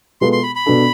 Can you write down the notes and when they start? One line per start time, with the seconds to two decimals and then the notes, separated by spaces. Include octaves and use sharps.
0.21 B2 G#3 B3 F4 A4 C6
0.32 C6
0.43 B5
0.55 B5
0.66 B2 B3 D4 A4